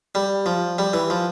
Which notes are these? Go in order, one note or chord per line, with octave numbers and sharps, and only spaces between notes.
G3
F3
G3
E3
F3